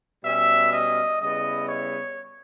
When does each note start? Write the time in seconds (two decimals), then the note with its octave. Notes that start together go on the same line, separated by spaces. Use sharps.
0.24 B2 G3 C#4 E5
0.73 D#5
1.22 C#3 G3 B3 E4 D#5
1.69 C#5